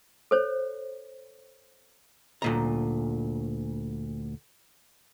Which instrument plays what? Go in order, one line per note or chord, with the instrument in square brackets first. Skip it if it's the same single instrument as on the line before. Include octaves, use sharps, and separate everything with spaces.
[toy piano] A4 C5 C#5
[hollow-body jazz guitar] D2 A#2 A#5